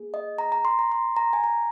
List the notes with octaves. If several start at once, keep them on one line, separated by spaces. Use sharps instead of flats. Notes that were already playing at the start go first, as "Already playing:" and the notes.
Already playing: A#3 G#4
D#5
A#5
A#5
C6
A#5
C6
A#5
G#5
A#5